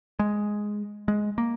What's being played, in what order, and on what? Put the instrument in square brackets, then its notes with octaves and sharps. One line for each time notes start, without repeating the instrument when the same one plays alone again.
[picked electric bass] G#3
G#3
A#3